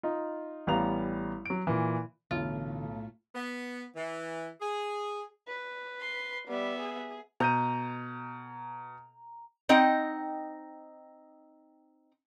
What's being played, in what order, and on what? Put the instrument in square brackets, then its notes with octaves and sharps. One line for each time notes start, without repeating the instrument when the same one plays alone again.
[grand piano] D#4 F4
A1 G3 B3 F5 A#5 F7
F#3 D7
A#2 E3
[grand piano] B1 [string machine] A2 A3 [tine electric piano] D3 E3 [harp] F4
[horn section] B3
E3
G#4
[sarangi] B4
[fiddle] C6
[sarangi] G3 [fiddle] B3 E5
[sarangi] G#4
[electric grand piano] B2 G6 D#7 [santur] A#5
[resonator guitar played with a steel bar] C4 D#4 D#5 F#5 G5